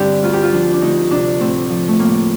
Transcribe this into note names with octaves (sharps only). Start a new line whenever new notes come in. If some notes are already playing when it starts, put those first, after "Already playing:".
Already playing: G2 D3 C4 D4 G4
D2 F4
G4
F4
F3 D4
D4
D2 D#4
C3 D4
A2 C4
F3
A3
A2 A#3